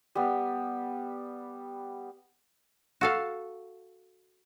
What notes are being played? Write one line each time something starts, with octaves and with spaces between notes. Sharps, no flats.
G3 B3
F#4 A4 F5